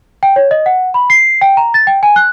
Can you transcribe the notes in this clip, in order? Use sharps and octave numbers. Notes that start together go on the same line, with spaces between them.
G5
C#5
D#5
F#5
B5
C7
G5
A#5
A6
G5
G#5
F#6